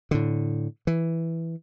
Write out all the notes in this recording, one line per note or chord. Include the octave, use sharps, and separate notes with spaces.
A2 D3
E3